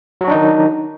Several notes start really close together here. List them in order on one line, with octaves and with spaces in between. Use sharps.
F#3 F#4 D4 D#4 D#3